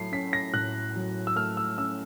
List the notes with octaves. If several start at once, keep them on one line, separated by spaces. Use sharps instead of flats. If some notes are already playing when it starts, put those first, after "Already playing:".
Already playing: A2 F#3 A3 C7
C#4 B6
A#6
A2 F#6
F#3
E6
A3 F6
E6
C#4 E6